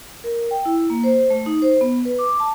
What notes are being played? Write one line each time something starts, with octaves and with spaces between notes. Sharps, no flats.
A#4
G5
E4
A#3
C5
A3
D#4
C5
B3
B4
D6
A5